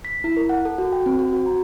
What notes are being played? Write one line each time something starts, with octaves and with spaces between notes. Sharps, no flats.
B6
E4
A#4
F#5
A4
F#4
G5
C4
F#4
F#4
A#5